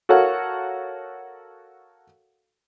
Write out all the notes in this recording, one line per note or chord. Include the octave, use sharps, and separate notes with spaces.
F#4 A4 A#4 C#5 F5 F#5